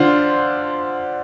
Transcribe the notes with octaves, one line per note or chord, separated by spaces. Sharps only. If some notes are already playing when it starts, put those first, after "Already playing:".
Already playing: D3 D4 F4 C5